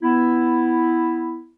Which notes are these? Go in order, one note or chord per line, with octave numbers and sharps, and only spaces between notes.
B3 E4